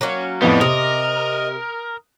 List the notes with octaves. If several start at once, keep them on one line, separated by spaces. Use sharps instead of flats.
F#3 A#3 C#4
F2 A2 G3 B3 D#5
C3 A#4 D#6